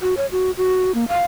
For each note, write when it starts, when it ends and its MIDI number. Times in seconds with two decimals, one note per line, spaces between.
0.01 0.14 66
0.17 0.26 73
0.31 0.51 66
0.57 0.91 66
0.94 1.04 58
1.08 1.24 77